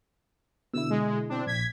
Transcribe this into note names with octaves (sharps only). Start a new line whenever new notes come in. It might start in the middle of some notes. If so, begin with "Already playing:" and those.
B2 D3 E4 E6
G#3
C4 D4
A#1 G#6 B6